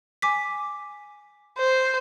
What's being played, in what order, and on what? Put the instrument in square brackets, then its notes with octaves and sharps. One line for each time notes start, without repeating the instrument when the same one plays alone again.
[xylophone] G#5 D6 B6
[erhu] C5